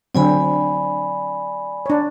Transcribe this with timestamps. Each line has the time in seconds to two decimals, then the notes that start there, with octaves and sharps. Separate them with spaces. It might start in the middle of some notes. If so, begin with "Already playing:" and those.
0.15 D3 F#3 C4 D5 G#5 B5
1.86 D4 C#5